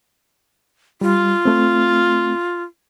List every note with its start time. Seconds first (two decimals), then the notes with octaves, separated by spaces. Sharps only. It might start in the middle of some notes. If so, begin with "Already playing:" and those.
1.01 G3 F4
1.45 A3 C4